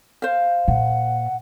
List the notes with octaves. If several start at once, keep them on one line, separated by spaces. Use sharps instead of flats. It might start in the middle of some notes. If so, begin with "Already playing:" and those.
C5 F5
A#2 F#5